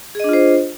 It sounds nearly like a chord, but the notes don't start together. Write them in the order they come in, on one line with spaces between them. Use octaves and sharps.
G#4 D#5 D4 F4 C5